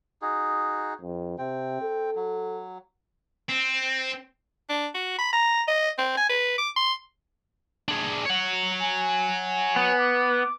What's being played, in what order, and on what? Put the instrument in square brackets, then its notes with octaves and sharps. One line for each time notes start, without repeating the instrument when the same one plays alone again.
[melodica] D#4 F#4 G#4
[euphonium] F2
[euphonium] C3 [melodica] C4 G5
[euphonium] A4
[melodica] F#3
[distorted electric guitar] C4
[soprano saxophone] D4
F#4
B5
A#5
D#5
C4
G#5
B4
D6
C6
[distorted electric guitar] D4 G#4
C#5 F#5
[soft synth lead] G#5
[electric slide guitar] B3
[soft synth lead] D6